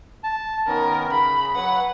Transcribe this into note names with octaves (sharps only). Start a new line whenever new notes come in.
A5
D#3 B3 C#4 A#4
C#3 B5
F#3 B4 F#5